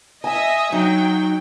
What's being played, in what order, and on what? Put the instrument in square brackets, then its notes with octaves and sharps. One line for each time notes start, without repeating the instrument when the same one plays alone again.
[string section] D#5 E5 [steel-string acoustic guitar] G#5
[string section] F#3 G5 [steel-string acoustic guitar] D#4